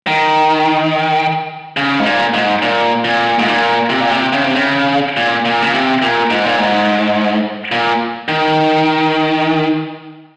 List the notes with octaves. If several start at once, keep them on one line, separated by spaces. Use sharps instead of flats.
D#3
C#3
G#2
A#2
G#2
A#2
A#2
G#2
A#2
C3
A#2
C3
C#3
C3
C#3
A#2
A#2
C#3
C3
A#2
G#2
A#2
G#2
A#2
D#3